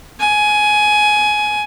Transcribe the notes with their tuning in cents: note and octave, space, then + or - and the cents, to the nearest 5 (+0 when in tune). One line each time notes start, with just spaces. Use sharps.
G#5 +15